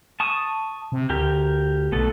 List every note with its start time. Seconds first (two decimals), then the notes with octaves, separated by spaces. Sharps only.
0.20 A5 C#6 D#6
0.92 C3
1.10 D2 G4 A#4
1.92 B1 A3 B3 A4